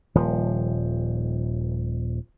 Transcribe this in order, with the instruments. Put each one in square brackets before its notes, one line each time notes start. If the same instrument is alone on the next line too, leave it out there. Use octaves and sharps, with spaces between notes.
[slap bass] D#1 F3